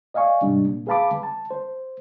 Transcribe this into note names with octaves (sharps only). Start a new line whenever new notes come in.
D5 D#5 F5 G#5 C#6
G#2 C3 G3 D4
A#2
G#4 B4 F5 A5 B5 D6
A5
C5